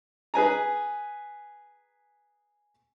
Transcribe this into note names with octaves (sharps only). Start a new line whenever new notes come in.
G#4 B4 G#5 A#5